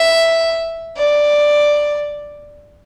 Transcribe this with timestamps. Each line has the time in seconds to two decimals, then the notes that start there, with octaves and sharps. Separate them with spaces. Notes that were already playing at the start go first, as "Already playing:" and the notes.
Already playing: E5
0.97 D5